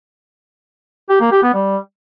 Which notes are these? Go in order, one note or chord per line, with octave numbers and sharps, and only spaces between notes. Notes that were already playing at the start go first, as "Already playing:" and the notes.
G4
A#3
G4
B3
G3